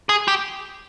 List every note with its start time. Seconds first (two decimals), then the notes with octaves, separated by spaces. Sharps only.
0.09 G#4
0.28 G4